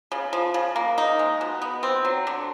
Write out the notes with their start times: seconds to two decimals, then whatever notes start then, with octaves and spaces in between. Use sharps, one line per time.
0.12 C#3
0.33 F3
0.54 C#3
0.76 A#3
0.98 D#4
1.19 G#3
1.41 B2
1.62 B3
1.83 C4
2.05 F#3
2.27 D3